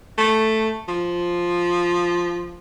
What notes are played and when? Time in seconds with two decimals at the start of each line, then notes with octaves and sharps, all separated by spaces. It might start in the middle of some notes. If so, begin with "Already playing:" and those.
0.18 A3
0.88 F3